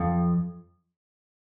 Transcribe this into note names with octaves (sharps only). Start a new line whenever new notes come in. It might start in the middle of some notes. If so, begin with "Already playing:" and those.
Already playing: F2